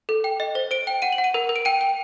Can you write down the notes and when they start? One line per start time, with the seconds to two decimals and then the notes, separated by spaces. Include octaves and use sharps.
0.09 A4
0.24 G5
0.40 D#5
0.55 C5
0.71 C5 D7
0.87 G5
1.02 F#5 D#7
1.12 F#7
1.18 F#5
1.24 D#7
1.34 A#4
1.49 A#4
1.56 D7
1.65 G5 D#7
1.81 G5